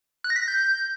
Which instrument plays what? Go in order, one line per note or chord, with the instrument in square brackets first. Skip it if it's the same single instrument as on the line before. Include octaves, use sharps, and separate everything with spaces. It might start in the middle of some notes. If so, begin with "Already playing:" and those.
[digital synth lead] F#6
A#6
B6
A#6
G6